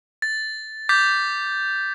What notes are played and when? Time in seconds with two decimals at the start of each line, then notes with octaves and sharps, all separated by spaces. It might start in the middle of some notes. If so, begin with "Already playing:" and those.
0.22 A6
0.89 D6 G6 A6 B6